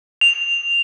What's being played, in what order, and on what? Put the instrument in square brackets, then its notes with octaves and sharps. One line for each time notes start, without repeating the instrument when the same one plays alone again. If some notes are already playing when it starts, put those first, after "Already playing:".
[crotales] F7